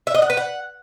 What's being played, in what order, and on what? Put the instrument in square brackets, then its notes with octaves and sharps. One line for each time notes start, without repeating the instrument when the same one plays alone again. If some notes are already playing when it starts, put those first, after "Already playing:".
[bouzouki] E5
D#5
F#5
B4
F#5